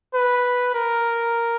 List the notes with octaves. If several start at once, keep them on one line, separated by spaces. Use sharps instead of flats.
B4
A#4